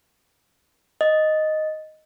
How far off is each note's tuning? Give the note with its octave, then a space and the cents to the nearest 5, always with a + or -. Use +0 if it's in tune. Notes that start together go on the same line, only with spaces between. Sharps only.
D#5 +0